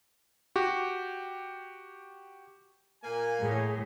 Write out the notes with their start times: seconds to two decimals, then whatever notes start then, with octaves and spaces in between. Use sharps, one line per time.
0.56 F#4 G4
3.04 A#2 A#3 G#5
3.42 A2 G#4